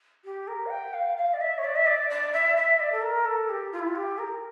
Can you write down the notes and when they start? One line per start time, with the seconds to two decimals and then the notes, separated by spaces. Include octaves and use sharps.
0.24 G4
0.47 A#4
0.66 F5
0.70 G5
0.93 F5
1.17 F5
1.33 D5
1.41 E5
1.58 C#5
1.64 D5
1.75 E5
1.86 D5
2.10 D5
2.32 E5
2.56 E5
2.79 D5
2.92 A4
3.02 A#4
3.25 A4
3.49 G4
3.72 F4
3.79 E4
3.87 F4
3.95 G4
4.18 A#4